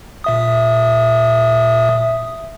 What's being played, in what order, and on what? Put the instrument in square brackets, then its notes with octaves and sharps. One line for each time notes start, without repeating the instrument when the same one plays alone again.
[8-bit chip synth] A#2 E5 D#6